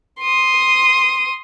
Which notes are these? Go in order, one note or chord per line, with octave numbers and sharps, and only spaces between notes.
C6 D#6